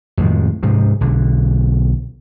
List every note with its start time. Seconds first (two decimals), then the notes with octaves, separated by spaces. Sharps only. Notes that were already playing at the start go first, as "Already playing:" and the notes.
0.17 F2 A2 D#3 G#3
0.63 G#2 C3 F3
1.01 B1 D3